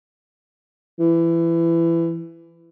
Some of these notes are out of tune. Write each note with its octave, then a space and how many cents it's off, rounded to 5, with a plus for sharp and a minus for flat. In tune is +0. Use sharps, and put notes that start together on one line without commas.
E3 +20